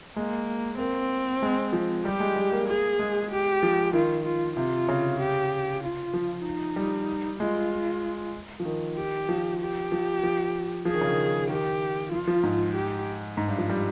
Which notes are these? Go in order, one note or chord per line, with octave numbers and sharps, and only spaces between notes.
G#3 A#3
A#3 C4
G#3
F3
G3 G4
G#3
G3
A#3
G#4
G#3
G4
F3
D#3 F4
F4
C3 F4
C#3
G4
F4
F3
D#4
G3
G#3 F4
F3
D#3
G4
F3
G4
F3
F3
F3 G#4
D#3
C#3
D#3
D#3 G4
F3 F4
F3
G#2
G4
G#2
G2
F3
G3